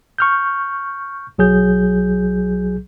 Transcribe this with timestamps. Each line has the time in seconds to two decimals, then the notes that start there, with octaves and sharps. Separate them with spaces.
0.18 C#6 F6 G6
1.38 B1 F#3 G#4 G6